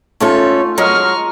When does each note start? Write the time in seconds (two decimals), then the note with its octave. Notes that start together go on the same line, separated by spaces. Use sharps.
0.20 G#2 A3 C#4 F4 A4
0.78 F#3 G#3 A#4 D#5 C#6 F6